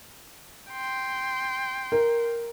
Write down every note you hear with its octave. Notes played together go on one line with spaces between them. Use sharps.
G5 C6
A#4